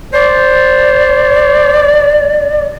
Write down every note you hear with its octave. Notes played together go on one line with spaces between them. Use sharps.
C5 D5